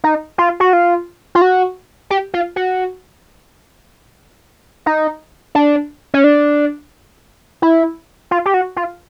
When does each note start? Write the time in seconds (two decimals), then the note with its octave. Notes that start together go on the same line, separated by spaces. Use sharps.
0.04 D#4
0.38 F4
0.60 F#4
0.73 F4
1.35 F4
1.42 F#4
2.10 G4
2.34 F4
2.56 F#4
4.86 D#4
5.55 D4
6.14 C#4
6.24 D4
7.62 E4
8.31 F4
8.46 G4
8.54 F#4
8.76 F4